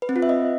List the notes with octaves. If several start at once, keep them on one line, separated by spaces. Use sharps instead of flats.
B4
C4
F4
E5
D#5